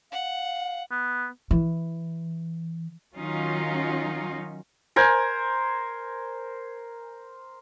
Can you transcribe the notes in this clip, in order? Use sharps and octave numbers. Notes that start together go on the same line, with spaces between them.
F5 F#5
B3
E3
D#3 F#3 C#4 D#4 F4
A#4 C5 G#5